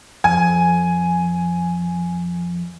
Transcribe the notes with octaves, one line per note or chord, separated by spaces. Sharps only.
F2 G#5